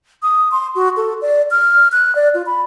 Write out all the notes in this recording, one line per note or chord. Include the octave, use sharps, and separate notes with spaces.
D#6
C6
F#4
A4
D5
F6
F#6
D5
F4
B5